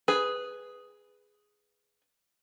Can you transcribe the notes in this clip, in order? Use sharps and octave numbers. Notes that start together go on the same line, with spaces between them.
G#4 B4